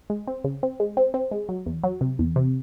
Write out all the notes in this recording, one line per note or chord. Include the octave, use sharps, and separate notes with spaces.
G#3
C4
C#3
C4
G#3
C4
C4
G#3
F#3
E2
F#3
C3
E2
C3